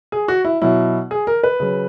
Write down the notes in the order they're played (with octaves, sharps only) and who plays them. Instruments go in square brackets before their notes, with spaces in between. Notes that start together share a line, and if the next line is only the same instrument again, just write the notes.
[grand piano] G#4
F#4
E4
B2 F#3 E4
G#4
A#4
B4
C#3 F#3